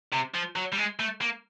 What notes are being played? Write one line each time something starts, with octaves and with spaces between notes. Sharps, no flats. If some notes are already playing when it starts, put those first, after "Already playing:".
C3
F3
F#3
G3
G#3
A3
A#3